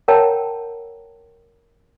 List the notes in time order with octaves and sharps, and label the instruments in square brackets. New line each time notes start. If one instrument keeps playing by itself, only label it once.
[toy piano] A#4 C#5 F#5 G5 A5 A#5